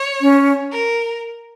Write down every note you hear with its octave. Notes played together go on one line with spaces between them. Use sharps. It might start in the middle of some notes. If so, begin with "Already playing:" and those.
Already playing: C#5
C#4
A#4